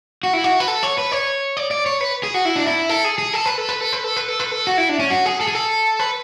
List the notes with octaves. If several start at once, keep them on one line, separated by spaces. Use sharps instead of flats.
F#4
E4
F#4
B4
A4
C#5
B4
C#5
D5
D5
C#5
B4
G#4
F#4
E4
D4
E4
A4
G#4
G#4
A4
B4
A4
B4
A4
B4
A4
B4
A4
B4
A4
F#4
E4
D4
C#4
F#4
G#4
A4
G#4
A4
B4